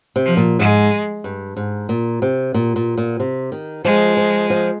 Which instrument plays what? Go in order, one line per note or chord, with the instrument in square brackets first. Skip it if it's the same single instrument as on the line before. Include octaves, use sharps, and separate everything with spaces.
[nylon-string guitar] C3
[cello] F3
[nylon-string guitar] A#2
[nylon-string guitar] G#2 [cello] G#3
[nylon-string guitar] G2
G#2
A#2
C3
A#2
A#2
A#2
C3
D#3
[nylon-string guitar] F3 [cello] G#3
[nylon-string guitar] F3
F3